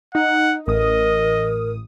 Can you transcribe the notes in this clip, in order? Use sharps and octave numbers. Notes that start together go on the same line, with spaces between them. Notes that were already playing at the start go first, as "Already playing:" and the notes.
D#4 F#5
A1 A#4 D#5 D#6